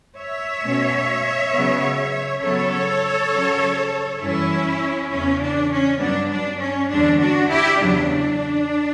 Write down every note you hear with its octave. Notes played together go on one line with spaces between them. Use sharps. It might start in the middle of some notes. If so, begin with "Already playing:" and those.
C#5 E5
B2 A3 C#4
C#3 F#3 B3
C#3 F#3 B3 A4 C#5
C#3 F#3 C#4
F#2 E3 G3 C#4 E4
E2 C#3 E3 C#4
D4
C#4
G2 F#3 B3 D4
D4
C#4
E2 D3 G3 D4
D4 F#4
E4 G4
E2 C#3 F#3 D4